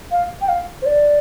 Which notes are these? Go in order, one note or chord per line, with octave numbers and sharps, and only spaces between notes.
F5
G5
F5
C5
D5